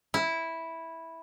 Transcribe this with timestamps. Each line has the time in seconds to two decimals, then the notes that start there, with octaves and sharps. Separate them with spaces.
0.14 E4